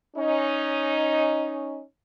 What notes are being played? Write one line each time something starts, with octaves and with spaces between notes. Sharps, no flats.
C#4 D#4